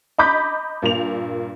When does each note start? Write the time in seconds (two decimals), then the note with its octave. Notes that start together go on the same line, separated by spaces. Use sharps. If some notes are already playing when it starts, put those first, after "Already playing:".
0.18 D#5 A#5 B5 D6 G6 B6
0.82 G2 A#2 A#3 F7